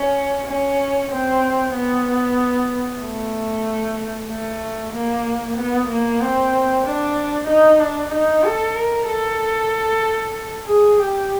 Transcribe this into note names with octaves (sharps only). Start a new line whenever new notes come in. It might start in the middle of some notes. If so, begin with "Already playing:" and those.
Already playing: C#4
C#4
C4
B3
A3
A3
A#3
B3
A#3
C4
D4
D#4
D4
D#4
A4
A#4
A4
G#4
G4